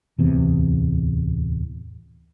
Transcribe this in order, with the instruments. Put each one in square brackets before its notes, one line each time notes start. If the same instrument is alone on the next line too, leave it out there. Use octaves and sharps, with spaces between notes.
[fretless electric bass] D1 E2 C3